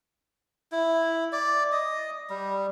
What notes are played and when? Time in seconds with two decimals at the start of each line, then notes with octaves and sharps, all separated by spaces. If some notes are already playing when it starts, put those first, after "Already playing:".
0.72 E4
1.32 D5
1.72 D#5
2.30 G3